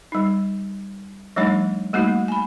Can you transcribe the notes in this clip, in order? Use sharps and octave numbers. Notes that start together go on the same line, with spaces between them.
G3 D#4
F3 G3 A3 D4 D#4 C#5
G3 A3 A#3 D#4 F#4
G#5 B5